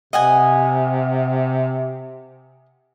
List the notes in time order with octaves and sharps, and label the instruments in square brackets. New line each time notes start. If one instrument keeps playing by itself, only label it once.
[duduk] C3 [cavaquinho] D#5 F#5 G#5